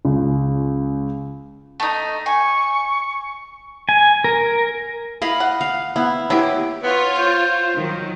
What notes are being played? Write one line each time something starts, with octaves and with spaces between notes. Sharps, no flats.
C#2
A3 D#4
G#5 C#6
G#5
A#4
E4 D#5 F5 B5
F#5
F5
B3 E4
F#3 B3 E4 G4
B3 F4 C#5
C5
D#3 F#3